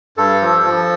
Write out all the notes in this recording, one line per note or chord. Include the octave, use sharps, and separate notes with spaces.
G2 A4
F3
F3